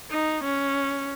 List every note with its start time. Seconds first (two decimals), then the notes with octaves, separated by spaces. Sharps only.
0.11 D#4
0.45 C#4